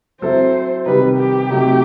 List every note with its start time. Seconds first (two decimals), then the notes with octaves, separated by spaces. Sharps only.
0.22 F#3 C4 E4 A4 C5
0.86 C3 D#3 G3 D#4 B4
1.18 G4
1.50 C3 F#3 A3 D#4